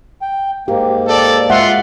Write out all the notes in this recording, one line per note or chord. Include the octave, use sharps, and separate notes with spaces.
G5
G#2 A#3 G4
A4 D5
G#3 F4 E5 F#5 C6